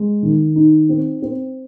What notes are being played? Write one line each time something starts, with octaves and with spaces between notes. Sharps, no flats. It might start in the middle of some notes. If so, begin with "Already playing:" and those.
Already playing: G#3
D#3
D#4
C4
C4